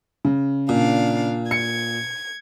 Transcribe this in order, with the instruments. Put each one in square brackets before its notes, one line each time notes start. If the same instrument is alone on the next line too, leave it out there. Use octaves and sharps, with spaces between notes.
[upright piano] C#3
[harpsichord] A#2 [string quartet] D4 F5
[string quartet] G#6 [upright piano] C#7